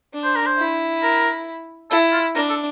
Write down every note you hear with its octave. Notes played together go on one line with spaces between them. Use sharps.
D4
C5
A#4
C5
E4
A#4
E4 A4
F4
D4 A#4
A4